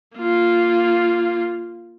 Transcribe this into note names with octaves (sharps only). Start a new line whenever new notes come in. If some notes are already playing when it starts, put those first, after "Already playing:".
A#3 F4